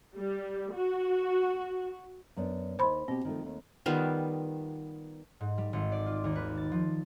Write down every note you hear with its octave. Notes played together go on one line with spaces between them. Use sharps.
G3
F#4
F#2 B3 D4
D#2 D#4 C5 B5 C6
B2 C4 G4
D#3 F3 A3
D#2 A3
D#3 G3 B3 F4
G#2
G3
G#1
D5
F4
D#2
B4
A6
F3